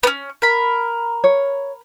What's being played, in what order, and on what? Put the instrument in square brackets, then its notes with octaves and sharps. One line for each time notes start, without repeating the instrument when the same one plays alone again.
[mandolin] B3 C#4
A#4 B5
[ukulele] C#5